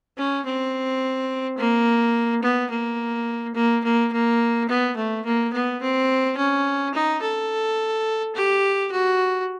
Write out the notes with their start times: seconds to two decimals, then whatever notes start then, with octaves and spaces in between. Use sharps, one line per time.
0.17 C#4
0.45 C4
1.58 A#3
2.42 B3
2.70 A#3
3.55 A#3
3.84 A#3
4.12 A#3
4.69 B3
4.96 A3
5.25 A#3
5.53 B3
5.82 C4
6.37 C#4
6.94 D#4
7.21 A4
8.35 G4
8.91 F#4